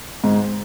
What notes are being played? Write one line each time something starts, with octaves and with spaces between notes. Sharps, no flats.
G#2